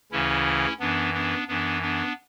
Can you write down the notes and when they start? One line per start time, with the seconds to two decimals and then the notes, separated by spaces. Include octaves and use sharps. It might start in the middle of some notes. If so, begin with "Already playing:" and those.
0.12 D2 C#3 E3 C#4 E4
0.80 F#2 E3 B3 D4
1.14 B3 D4
1.48 F#2 E3 B3 D4
1.82 B3 D4